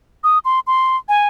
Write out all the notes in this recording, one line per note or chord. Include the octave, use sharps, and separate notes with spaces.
D#6
C6
C6
G#5